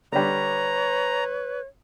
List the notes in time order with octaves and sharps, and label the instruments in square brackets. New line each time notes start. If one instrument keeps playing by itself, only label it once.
[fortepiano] D3 G3 [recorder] B4 [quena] C#5 [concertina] A#5